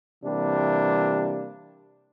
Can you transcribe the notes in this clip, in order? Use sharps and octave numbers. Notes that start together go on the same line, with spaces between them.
C3 E3 G3 A#3 D4